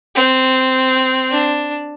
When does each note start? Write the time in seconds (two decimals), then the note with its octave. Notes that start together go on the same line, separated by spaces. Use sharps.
0.15 C4
1.32 D4